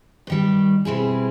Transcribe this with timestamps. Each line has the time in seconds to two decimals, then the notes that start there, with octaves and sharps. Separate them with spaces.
0.27 G2 D#3 G3
0.85 B2 G3 C4 E4 G#4